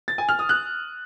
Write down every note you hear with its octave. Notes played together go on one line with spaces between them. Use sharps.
A6
G#5
F6
D#6
F#6